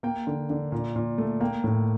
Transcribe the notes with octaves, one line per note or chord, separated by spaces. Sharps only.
A#3 G5
D3
D3
A#2
A#2
A3
A#3 G5
A2